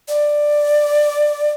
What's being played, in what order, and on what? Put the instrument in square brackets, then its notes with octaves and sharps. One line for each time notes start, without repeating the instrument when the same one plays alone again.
[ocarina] D5